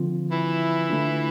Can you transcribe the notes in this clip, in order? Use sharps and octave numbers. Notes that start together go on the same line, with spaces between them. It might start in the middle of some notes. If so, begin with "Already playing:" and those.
Already playing: D3 F3 C4 F4
E3 E4
D3 A3 D4 F4